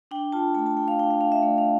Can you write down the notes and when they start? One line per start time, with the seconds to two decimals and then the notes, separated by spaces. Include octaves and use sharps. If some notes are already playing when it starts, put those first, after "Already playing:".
0.11 D4 G5
0.32 F4 A5
0.55 A3 A5
0.66 A5
0.77 A3 G5
0.88 F5
0.99 D4 G5
1.10 F5
1.21 F4 F5
1.32 E5
1.43 A3 D5
1.58 F5